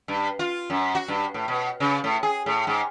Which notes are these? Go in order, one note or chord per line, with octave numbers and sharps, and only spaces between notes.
G2
F4
F#2
F#4
G2
A2
B2
C#3
A2
G#4
A2
G#2